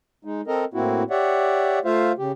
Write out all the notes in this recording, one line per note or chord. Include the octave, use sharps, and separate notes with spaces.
G#3 D#4
C4 A4 A#4 D#5
A2 A#3 C4 E4 F#4
G4 C#5 D5 E5 F#5
A3 F4 C5 E5 F5
C#3 G4